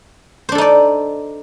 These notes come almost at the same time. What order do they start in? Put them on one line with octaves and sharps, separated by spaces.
C5 D4 A4 D#4 D5